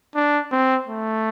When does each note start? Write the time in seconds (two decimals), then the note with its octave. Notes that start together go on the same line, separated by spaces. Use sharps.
0.15 D4
0.51 C4
0.87 A3